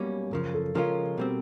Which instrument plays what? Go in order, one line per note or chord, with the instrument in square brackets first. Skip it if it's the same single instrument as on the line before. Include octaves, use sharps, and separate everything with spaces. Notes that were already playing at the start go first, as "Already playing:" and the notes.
Already playing: [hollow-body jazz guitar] B1 B2 G3 A#3 C#4
[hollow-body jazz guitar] F#2 C#3 F3 [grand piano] A#4
[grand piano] A4
[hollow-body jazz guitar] C#3 F3 G#3 C#4 F4 [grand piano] A#4
[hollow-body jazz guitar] B2 G3 C4